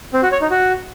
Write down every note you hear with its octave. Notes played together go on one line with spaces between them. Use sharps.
C4
F#4
C#5
D#4
F#4